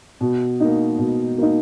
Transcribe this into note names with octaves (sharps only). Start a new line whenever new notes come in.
B2
A#3 D#4
B2
A#3 D#4